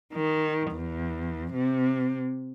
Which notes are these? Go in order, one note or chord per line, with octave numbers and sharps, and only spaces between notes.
D#3
E2
C3